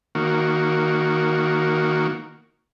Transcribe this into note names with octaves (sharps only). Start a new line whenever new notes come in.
D#3 A#3 F#4